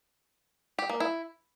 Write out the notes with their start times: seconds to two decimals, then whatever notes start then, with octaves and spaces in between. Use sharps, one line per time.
0.79 G4
0.89 A#3
1.00 E4